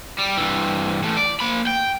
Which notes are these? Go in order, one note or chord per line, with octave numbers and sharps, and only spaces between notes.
G3
G2 E3
E3 A3
D5
A#3 B5
G5